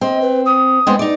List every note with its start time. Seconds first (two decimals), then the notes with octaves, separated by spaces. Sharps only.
0.01 C4 D#5
0.22 B4
0.45 D#6
0.87 G#3 B3 C4
0.99 D#4 D5